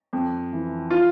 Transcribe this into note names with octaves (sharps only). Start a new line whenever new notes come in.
F2
E3
F4